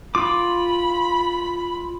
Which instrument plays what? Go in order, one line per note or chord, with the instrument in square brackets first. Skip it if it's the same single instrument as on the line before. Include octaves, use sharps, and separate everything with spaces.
[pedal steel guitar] F4 D6 [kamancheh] B5